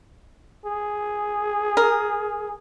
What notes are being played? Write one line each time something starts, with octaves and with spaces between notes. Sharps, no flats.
G#4
A#4